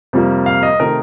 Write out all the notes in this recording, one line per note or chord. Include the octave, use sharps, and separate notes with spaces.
F2 C3 G3 A#3
F5
D#5
C3 D#3 A3 A#4